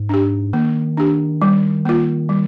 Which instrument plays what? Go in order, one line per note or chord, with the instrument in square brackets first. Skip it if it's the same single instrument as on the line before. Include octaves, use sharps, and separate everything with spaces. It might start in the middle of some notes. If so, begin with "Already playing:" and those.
Already playing: [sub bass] G#2
[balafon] D4 G4
[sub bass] D#3 [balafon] A#3
[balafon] D4 G4
G3
A#3 F4
G3